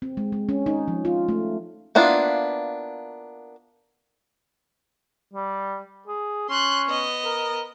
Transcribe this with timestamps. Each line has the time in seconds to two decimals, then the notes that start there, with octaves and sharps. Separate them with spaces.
0.02 C4
0.17 G#3
0.32 G#3
0.49 C#4
0.66 D#4
0.88 F3
1.05 F4
1.29 A3
1.95 A#3 B3 D4 E4 F4
5.34 G3
6.08 G#4
6.49 C#4 C6 F#6
6.87 B3 D#5
7.25 A#4